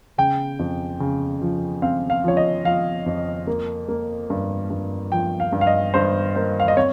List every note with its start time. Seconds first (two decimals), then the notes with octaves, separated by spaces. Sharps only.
0.18 C#3 G5
0.59 F2
1.00 C#3
1.41 F3
1.82 C4 F5
2.10 F5
2.24 F3 C#5
2.37 D#5
2.65 F3 F5
3.06 F2
3.47 A#3
3.88 A#3
4.30 G2
4.70 G2
5.12 F3 G5
5.40 F5
5.53 G2
5.61 F5
5.67 D#5
5.94 G2 C5
6.36 A#3 C5
6.60 F5
6.68 D#5
6.77 C4 C#5